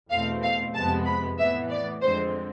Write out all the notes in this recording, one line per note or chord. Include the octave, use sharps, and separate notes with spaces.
E2 B2 A3 C4 F5
F5
F2 C3 F3 G#3 B3 A5
B5
A2 E3 B3 E5
D5
F2 D3 G#3 C4 C5